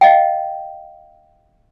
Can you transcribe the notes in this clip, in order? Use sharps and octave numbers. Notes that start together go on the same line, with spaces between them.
D#5 F5 G5